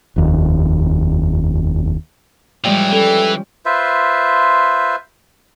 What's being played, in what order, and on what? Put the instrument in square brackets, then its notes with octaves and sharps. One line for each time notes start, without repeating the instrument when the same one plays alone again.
[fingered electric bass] F1 D#2
[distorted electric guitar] A2 E3 [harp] F3 G3 G#3 [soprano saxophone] G5
[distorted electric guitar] E3 [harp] C#4 [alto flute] A4
[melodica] F4 B4 C5 E5